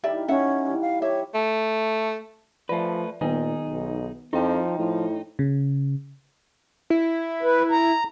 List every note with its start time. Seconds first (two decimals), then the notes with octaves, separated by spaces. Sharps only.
0.04 D#3 G3 E4 G4 D5 E5
0.28 C#4 E5 F#5
0.65 E3 G3
0.81 F5
1.02 G4 C#5 E5 C#6
1.35 A3
2.69 F3 A3 B4 D5 E5
3.21 A#2 D#3 B3 D#4 G#4
3.69 B1
4.33 F2 F3 D#4 E4 G5
4.79 A2 F3
5.39 C#3
6.90 E4
7.43 B4
7.71 A#5